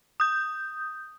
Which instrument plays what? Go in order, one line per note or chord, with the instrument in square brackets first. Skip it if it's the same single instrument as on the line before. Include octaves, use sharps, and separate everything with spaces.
[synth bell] D#6 G6